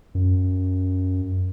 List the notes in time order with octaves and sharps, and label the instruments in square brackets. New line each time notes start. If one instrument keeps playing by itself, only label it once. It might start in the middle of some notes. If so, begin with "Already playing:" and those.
[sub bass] F#2